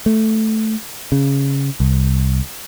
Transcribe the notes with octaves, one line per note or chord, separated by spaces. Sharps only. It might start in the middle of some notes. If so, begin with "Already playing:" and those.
A3
C#3
C2